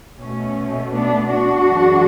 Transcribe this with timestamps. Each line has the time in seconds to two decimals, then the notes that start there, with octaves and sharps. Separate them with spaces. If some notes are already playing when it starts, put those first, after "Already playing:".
0.18 B2 A3 C#4
0.91 B3 D4
1.28 D4 F#4
1.64 F#2 E3 G#3